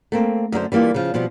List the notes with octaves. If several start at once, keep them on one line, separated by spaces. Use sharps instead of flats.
A3 A#3 C4
F#2 D3 A#4 C5
E3 G3 A#3 D4 F4
C#3 F3
B2 F3 G3 C4